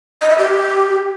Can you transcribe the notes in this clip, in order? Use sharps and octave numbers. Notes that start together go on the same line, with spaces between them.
D#5
E5
G4